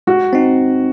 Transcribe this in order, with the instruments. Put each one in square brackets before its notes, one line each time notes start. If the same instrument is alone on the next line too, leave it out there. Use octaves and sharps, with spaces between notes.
[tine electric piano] G#3 [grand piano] F#4
[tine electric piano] C4 D#4